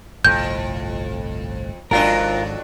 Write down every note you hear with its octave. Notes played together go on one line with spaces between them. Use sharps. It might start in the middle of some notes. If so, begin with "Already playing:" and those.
G1 C2 F2 A2 G6
G#1 F2 G#2 F#3 D4 F4 A#4